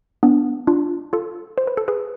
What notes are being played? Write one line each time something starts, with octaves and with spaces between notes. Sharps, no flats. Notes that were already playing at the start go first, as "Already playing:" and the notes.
B3 D4
D4 F4
F4 A4
C5
B4
A4
G#4 B4